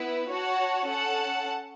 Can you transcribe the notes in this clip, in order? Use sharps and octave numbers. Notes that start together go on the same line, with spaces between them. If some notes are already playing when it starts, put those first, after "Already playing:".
Already playing: B3 E4 B4
F#4 C#5 F#5 A5
C#4 A4 F#5 A5